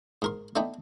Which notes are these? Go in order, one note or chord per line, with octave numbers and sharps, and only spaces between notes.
G#2 A#4 C6
A3 B3 D4 D#4 G5